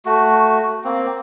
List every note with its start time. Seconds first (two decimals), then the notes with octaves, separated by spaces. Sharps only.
0.06 A3 F#4
0.84 A#3 C4